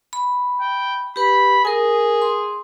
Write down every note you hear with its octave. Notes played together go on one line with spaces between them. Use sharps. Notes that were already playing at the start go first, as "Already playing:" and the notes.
B5
G5
G4 B4 B5
G#4 A#4 G#5
C6